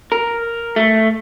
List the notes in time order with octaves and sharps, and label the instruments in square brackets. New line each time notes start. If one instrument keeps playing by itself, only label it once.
[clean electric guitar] A#4
A3